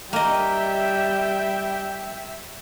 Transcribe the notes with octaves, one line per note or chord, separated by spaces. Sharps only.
G3 A#3 D#5 E5 G5